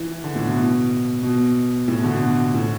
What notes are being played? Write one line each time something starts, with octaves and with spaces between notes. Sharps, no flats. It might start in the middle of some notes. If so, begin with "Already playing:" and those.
Already playing: E3
D3
A2
B2
B2
B2
A2
B2
D3
B2
A2